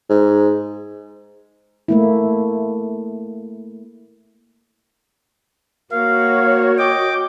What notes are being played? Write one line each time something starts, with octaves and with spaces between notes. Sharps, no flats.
G#2
A3 A#3 E4
A#3 F#4 C#5 F5
D#5 G5 D6